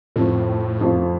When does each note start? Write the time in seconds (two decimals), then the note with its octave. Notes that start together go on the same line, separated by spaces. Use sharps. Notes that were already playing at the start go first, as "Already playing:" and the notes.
0.16 F2 A2 F3 A3 C4 F4
0.81 F2 F3 A3 C4 F4